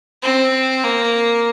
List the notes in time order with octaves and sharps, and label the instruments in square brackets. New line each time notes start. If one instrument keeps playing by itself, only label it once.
[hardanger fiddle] C4
A#3